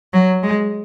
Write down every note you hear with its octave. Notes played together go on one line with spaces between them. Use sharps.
F#3
G#3